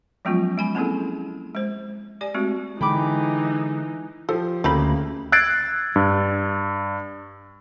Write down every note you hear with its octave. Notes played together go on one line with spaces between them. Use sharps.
F3 F#3 G#3 B3 C#4 F4
G#3 G#5 B5
A#3 C4 C#4 E4 G#4 A4
G#3 C5
G4 D5 G#5
G#3 A3 C4 F#4
D3 E3 G#3 D#4 G5 B5 D6
F3 G4 A4
D2 C#3 A3 A#3 C4 G4 B5
E6 F#6 G#6 A6 C7 D7
G2